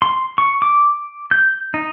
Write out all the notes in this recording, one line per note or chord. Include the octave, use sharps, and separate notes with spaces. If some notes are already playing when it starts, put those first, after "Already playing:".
C6
C#6
D6
G6
D#4